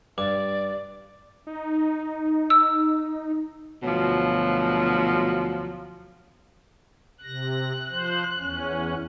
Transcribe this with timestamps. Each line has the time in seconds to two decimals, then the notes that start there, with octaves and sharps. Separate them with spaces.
0.18 G2 D5 D6
1.47 D#4
2.50 E6
3.83 D2 B2 F3 F#3
7.23 C3 F#6 A#6
7.90 F3 C5
8.38 E2 C#4